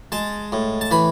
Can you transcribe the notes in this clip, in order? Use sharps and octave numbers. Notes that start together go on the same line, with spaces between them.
G#3 A5
A2
A5
E3 B5